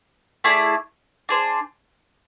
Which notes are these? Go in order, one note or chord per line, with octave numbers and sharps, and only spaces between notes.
A3 E4 G#4 D5
D4 G#4 C5